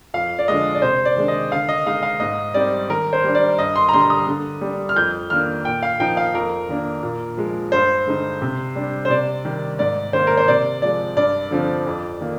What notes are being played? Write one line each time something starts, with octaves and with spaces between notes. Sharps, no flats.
F2 F5
D5
D3 F3 G#3 D#5
D5
C3 C5
D5
D#3 G#3 D4
D#5
D3 F5
D#5
G#3 D#4 F5
F5
G#2 D#5
G3 C4 D#4 D5
D#3 A#4
C5
G3 D4
D5
G2 D#5
C6
A#5
D3 G3 C6
D#6
D3
G3 D4
F6
F2 G6
D#3 A#3 D4 F6
A#2 G5
F5
F3 A#3 D#4 G5
F5
F2 A#4
D#3 A#3 D4
A#2
F3 G#3
G2 C5
D3 G#3 D#4
C3
G3 D4
C5
C3 D5
D#3 G3
G#2 D5
D#3 A#3 C5
A#4
C5
C3 D5
F3 G#3 D5
G2 D5
D3 F3 C4
F2
D#3 A#3